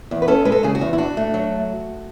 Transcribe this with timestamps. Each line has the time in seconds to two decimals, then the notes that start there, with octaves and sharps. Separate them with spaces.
0.11 E2
0.22 B4
0.28 C#4 A4
0.45 G#3 B4
0.52 A4
0.63 C#3 G#4
0.75 F#4
0.81 E2
0.93 E4
0.98 D4 F#4
1.17 A3
1.34 F#3